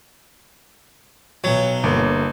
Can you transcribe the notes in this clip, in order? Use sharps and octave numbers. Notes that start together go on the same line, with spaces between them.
B1 F#3 C#5
G1 A#3